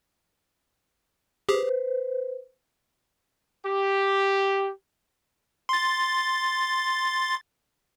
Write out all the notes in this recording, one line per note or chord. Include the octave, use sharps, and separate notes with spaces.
G4 G#4 B4 C5
G4
C6 A6